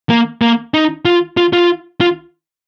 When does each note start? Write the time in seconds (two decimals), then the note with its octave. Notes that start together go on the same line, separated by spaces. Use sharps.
0.09 A#3
0.41 A#3
0.74 D#4
1.05 F4
1.37 F4
1.53 F4
2.01 F4